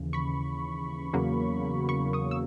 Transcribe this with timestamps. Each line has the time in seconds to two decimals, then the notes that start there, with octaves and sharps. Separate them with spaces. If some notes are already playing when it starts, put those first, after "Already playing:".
Already playing: D#2 C#3 E3
0.13 B5 C#6
1.13 E2 C#3 F#3 A#3
1.89 B5 C#6
2.13 C#6 D#6
2.31 E6